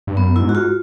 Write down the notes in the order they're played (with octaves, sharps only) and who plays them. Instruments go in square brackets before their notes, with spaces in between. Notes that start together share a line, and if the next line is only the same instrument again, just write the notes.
[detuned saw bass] G2
[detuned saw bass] F#2 [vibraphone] B3
[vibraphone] E4
[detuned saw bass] G#2
[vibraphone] F#4
F4